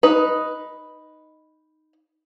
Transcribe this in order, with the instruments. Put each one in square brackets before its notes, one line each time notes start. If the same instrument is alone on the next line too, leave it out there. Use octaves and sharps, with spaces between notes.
[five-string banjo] D#4 B4